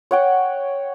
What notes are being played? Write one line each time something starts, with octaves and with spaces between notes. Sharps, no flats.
C#5 F#5 G5